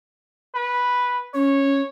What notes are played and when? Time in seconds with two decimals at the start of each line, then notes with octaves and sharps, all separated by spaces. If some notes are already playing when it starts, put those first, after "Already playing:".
0.55 B4
1.34 C#4 C#5